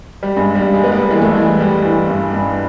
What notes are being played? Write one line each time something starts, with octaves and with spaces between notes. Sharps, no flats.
G3
G2 G#3
G3
G2
G#3
G3 B3
A#3
E3 G#3
A3
E3 G#3
G3
E3
G2
G2